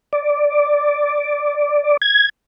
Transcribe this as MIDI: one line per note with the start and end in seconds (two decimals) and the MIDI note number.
0.13 1.97 74
2.02 2.29 92